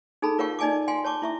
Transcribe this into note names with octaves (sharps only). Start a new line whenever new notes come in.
D#4 G#4 A4 A5 B5
F4 A#4 C#5 F5 G5 C#6
D#4 D5 D#5 G#5 A5 D6
F5 G5 G#5 C6
C#5 A5 C#6 D6
E4 E5 C#6